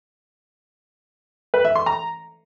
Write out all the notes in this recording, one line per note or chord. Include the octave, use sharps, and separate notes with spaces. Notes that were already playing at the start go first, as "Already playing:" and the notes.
B4
E5
C6
A#5